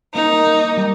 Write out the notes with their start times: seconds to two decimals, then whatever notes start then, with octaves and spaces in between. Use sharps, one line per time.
0.15 A#3 D#4
0.46 A#3
0.77 G3